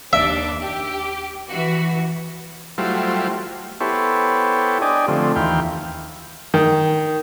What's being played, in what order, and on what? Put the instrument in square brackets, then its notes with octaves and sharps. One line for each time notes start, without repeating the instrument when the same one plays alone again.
[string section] D#2 D4 [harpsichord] E5
[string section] G4
E3 F#4
[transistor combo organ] F#3 G3 A3 E4 F4 C5
B3 E4 G4 A4 C5 C#5
D4 G4 D5 D#5 G#5
D3 F3 A3 C4
D#2 E3 F5 G5
[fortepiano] D#3